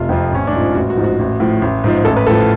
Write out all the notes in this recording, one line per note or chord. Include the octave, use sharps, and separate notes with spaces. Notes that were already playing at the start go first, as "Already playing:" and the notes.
Already playing: F1 F4
F2 F3
A1 C#4
D4
G#2 F3
F4
A1 F#4
F#4
G#2 F3
F#4
A1
A2 F3
A1
G#2 F3
A1 A4
B4
A2 F3 A4
F4